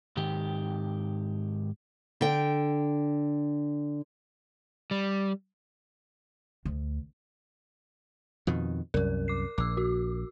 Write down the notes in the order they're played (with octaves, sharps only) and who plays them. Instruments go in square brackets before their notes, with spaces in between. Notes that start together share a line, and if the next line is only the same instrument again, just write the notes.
[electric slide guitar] G#2 D#3 G4
[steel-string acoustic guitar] D3 G5
[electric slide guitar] G3
[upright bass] D2
[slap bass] F2 B2 D#3
[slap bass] C2 F#2 [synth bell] A#4
[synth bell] D6 C7
[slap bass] A#1 [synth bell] D6 E6
[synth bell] F#4